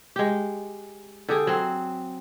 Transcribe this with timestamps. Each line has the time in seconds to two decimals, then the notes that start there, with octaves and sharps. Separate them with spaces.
0.16 G#3 G4
1.29 D3 G4 G#4
1.47 F#3 C4